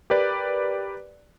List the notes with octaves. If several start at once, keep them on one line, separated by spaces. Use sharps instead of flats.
G4 A#4 B4 D5